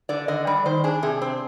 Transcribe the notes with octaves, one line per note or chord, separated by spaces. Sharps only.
D3 D5
D3 D#5
G3 D5
D#3 C5
D4 G#4
C3 G#4
C4